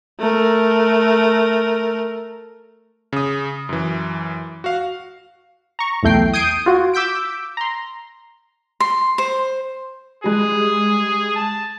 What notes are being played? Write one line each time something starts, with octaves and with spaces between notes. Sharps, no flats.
A3 A#4
C#3 D#6
F#2 E3
F#4 F5
A#5 C#6
B1 E2 A3 G5 C7
D#6 G6 G#6 C7 D7 D#7
F4 F#4
D6 E6 G6 B6 D7
A#5 C6
C6
C5
G3 G#3 G#4
A5